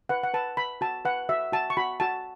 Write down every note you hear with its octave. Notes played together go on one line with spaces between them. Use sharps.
B4 F#5
F#5
B4 A5
B4 B5
F#4 A5
B4 F#5
F#4 E5
F#4 A5
C#6
F#4 B5
F#4 A5